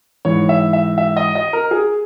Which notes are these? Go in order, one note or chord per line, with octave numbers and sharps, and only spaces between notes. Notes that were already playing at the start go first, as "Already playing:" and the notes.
G#2 E3 C#5
E5
E5
E5
D#5
D#5
A#4
G#4